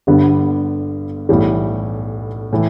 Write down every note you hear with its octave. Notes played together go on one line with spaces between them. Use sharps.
G1 G2 D3 G3 B3
B1 A2 E3 G3
A2 E3